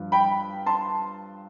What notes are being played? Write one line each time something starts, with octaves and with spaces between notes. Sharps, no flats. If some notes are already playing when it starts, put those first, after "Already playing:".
Already playing: G2 F3
G5 B5
A5 C6